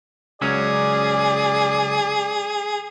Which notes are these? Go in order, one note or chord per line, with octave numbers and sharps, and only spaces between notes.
C#2 F#3 C#4 G#4 D5